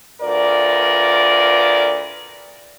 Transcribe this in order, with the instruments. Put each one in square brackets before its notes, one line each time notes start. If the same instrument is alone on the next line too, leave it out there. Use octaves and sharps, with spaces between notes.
[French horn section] D2 F4 A#4 B4 D5